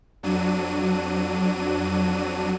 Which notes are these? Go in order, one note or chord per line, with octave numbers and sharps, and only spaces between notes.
F2 F#3 D4 D#7